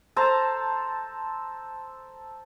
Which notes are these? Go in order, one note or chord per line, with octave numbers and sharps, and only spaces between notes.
A4 C5 A5 A#5